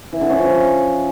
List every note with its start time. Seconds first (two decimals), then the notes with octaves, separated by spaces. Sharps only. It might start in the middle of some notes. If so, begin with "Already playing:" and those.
0.13 E3
0.21 D3
0.30 C#4
0.38 F3